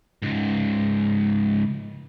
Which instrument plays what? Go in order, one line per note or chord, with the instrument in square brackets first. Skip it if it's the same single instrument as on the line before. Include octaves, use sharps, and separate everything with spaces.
[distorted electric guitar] C#2 G#2